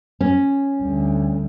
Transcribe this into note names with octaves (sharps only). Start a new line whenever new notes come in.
C#4
D2 G3